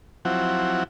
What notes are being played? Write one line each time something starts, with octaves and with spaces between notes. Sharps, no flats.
F3 F#3 C4 E4 F#5